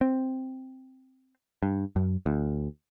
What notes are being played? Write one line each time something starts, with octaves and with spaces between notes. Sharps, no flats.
C4
G2
F#2
D2